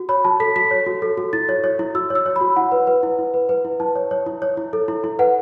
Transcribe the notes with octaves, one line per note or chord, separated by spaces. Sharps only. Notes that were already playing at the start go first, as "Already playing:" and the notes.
Already playing: F#4
C#5 B5
F#4 A5
A4 B6
F#4 B6
C#5
F#4
A4
F#4
E4 A6
C#5
C#5
E4
F#4 E6
C#5
E6
C#5
B5
F#4
E4 F#5
B4
B4
E4
E4
B4
B4
E4
E4 A5
C#5
C#5
E4
C#5
E4
A4
E4
E4
B4 F#5